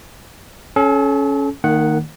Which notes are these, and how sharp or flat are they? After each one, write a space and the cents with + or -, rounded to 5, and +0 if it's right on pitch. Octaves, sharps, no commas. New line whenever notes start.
C#4 +0 A4 -35
D#3 -10 A#3 -40 F#5 +0